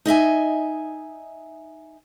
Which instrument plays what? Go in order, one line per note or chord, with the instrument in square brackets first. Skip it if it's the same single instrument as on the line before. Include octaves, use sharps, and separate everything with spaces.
[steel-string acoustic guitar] D#4 D#5 E5 G#5